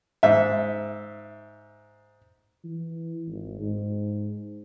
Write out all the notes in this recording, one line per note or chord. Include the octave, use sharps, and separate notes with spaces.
G#2 E5
E3
G#1
G#2